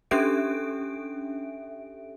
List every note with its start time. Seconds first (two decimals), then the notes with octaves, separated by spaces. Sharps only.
0.11 C#4 D4 G4 A4 E5 D7